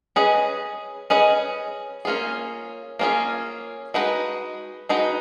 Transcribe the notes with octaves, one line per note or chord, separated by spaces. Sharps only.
C#4 G#4 B4 D#5
C#4 G#4 B4 D#5
A#3 C#4 F4 G#4
A#3 C#4 F4 G#4
G#3 D#4 F#4 B4
G#3 D#4 F#4 B4